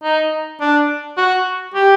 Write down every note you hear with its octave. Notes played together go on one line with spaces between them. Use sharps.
D#4
D4
F#4
G4